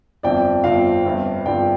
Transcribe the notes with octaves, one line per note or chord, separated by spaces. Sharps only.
G1 F2 F3 C4 D5 G5
G1 F2 F3 C4 F5
G1 G2 F3 C4
G1 G2 F3 C4 D5 G5